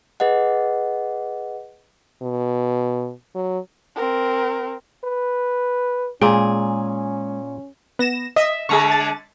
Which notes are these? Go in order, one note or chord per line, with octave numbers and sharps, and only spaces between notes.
G#4 B4 D#5 F#5
B2
F#3
C4 A#4
B4
A#2 G#3 C#4 G#4 G5
B3 A#6 E7
D#5 E5
D3 G#3 G#4 A#5 C#6
A6